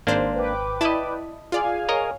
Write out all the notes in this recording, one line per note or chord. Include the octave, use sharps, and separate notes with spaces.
G#1 A#3 D4 C5
B4 G5 D6
E4 D5 D#5 A5 B5
F4 G#4 D5 F5 G#5
A#4 C#5 D#5 A#5